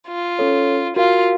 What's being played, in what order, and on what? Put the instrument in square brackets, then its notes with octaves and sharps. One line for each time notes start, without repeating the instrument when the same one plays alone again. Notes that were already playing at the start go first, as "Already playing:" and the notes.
[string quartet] F4
[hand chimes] C#4 A4 C#5
[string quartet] F4 [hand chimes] F#4 A#4 F5